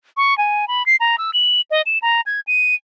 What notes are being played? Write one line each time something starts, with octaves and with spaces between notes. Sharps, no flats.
C#6
G#5
B5
C7
A#5
E6
F#7
D#5
E7
A#5
G#6
D#7